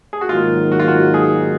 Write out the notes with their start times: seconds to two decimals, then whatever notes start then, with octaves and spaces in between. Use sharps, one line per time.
0.13 G#4
0.21 F#4
0.29 G#2 D#3 F#3 A#3 D#4 F4
0.72 F#4
0.80 F4
0.88 F#4
1.14 G#4